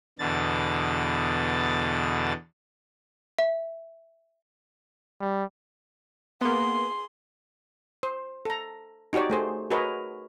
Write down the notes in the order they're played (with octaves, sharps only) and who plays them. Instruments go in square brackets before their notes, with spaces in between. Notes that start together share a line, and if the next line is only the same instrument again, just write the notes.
[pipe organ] E2 B2 D3 A6
[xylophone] E5
[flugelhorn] G3
[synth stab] A#3 B3 [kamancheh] G#4 C6
[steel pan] C5
A4 A#5
D#4 F#4 G4 C#5 D5
A3 G#4 C5
F#4 G#4 A#4 B4 C#5 D#5